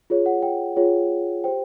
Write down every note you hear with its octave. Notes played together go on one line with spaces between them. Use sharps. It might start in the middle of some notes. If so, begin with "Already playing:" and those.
F4 G#4 C#5
F#5
G5
F4 G#4 C#5
G4 C5 G5